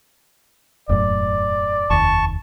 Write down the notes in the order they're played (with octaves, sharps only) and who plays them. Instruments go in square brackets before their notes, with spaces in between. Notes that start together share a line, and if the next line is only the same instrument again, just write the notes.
[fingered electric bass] E1 F#2 A2 [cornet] D5
[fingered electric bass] F1 D#2 [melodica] A5 C#6